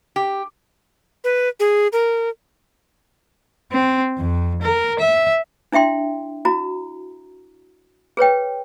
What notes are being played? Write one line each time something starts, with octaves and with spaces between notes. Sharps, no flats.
G4
B4
G#4
A#4
C4
F2
A#4
E5
D4 E4 E5 G5 C6
E4 F#4 A#5
G#4 B4 C#5 G5